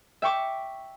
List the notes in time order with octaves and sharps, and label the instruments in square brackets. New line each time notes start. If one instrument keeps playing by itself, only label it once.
[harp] E5 G5 C#6 D6